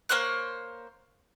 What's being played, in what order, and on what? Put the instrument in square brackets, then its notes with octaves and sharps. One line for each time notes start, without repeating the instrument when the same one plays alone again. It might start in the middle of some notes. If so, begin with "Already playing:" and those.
[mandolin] A#3 C5 C#5 F#6